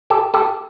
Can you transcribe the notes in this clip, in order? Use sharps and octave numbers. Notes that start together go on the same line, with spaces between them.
G4 A4
G4 A4